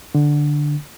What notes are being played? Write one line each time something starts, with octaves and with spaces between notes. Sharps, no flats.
D3